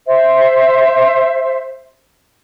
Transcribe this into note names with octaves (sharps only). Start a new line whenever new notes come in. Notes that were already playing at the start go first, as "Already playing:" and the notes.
C5 E5